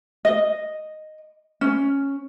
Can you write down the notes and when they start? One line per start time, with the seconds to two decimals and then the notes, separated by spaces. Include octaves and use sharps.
0.25 D#5
1.61 C#4